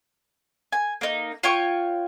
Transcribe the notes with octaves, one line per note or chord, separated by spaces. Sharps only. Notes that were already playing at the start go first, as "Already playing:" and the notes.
G#5
A#3 D#4
F4 C#5 G5 C#6